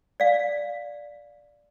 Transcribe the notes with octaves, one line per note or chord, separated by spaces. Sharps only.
D5 F5